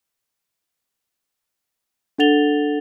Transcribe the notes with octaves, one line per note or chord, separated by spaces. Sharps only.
D4 A4 F#5 A6 F7 G7